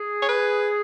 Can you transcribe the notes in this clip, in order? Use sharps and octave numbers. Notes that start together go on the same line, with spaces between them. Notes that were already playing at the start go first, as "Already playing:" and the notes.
Already playing: G#4
C#5
B4